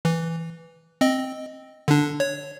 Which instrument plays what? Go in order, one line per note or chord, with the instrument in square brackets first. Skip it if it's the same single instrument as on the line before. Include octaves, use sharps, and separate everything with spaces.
[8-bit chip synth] E3
C4 D#5
D3 D4
C#5